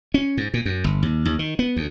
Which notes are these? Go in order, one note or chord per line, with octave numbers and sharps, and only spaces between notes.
C#4
G#2
A#2
F#2
G1
D#2
D#2
D#3
B3
D2